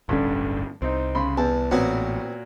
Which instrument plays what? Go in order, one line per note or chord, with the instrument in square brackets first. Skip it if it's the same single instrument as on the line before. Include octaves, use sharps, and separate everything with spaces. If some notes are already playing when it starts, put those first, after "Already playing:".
[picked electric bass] D1 G1 C#4 [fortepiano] G2 D3
[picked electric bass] C2 [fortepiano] C4 D#4
[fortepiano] C#3 B5 C6
[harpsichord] E2 [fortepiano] A5
[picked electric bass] A1 [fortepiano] A#2 F#4 C#5 [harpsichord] B3 C4